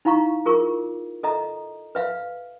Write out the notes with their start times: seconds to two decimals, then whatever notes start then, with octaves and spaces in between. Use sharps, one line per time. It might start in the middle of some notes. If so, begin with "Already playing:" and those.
0.05 D#4 E4 F5 A#5 C#6
0.45 F4 G#4 A#4 C#6
1.23 A4 D#5 E5 A#5
1.95 B4 E5 F5